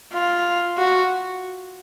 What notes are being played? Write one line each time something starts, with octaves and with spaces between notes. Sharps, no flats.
F4
F#4